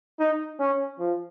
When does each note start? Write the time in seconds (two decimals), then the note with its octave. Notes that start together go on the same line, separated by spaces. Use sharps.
0.20 D#4
0.60 C#4
0.99 F3